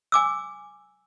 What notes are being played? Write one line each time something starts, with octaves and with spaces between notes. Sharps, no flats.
G#5 D6 E6